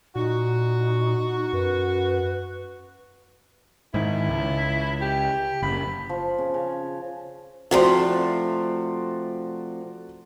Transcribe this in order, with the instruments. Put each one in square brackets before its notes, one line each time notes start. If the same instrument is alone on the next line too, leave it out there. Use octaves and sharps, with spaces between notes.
[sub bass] A#2 [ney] D#4 [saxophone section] F#4
[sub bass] F#2 [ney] B4
[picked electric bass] G#2 D#3 [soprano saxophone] E4
[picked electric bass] C#2
[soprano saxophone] G4
[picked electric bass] F#1 [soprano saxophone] B5
[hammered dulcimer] F3
C#3
C#3
[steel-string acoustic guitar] C3 F3 A3 [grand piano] F#4 D5 C6